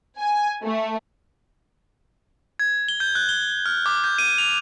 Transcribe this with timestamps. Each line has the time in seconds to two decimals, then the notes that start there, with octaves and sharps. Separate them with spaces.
0.19 G#5
0.64 A3
2.60 G#6
2.88 G7
3.00 G6
3.15 F#6
3.29 G7
3.66 F6
3.86 D6
4.04 G6
4.18 D#7
4.38 F7